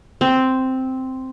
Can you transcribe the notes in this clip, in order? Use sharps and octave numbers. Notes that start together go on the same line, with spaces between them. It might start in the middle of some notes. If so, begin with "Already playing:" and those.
C4